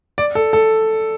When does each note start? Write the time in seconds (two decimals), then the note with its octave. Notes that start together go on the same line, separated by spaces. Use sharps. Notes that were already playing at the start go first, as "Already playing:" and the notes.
0.18 D5
0.35 A4
0.53 A4